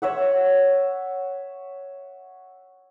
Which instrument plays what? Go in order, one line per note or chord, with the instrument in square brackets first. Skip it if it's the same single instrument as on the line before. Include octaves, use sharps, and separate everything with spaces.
[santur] C#5 E5 F#5